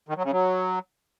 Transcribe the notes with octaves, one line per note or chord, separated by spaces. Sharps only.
D#3
F#3
C#3
F#3